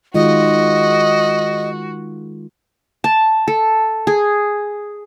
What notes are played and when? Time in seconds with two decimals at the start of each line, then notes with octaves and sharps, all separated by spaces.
0.15 D#3 G#3 F4 F#4 D#5
3.04 A5
3.48 A4
4.07 G#4